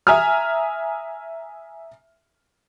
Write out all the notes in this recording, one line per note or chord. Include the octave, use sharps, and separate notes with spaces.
E5 G#5 A#5 D#6 F6